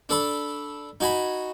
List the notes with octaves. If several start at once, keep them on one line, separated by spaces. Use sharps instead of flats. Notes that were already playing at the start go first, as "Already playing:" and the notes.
D4 A4 B5
D#4 F#4 G#5 B5